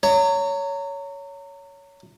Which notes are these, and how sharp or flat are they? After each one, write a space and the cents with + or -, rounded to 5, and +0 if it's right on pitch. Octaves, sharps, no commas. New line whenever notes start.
C#5 +15 A#5 -30